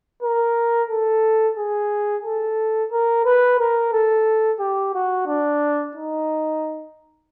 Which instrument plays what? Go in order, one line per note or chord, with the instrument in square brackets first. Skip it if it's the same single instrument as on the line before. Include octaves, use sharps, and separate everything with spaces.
[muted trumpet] A#4
A4
G#4
A4
A#4
B4
A#4
A4
G4
F#4
D4
D#4